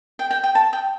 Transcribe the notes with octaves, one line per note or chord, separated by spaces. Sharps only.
G5
G5
G5
A5
G5